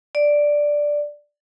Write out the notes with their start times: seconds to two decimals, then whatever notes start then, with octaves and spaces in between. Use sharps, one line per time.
0.15 D5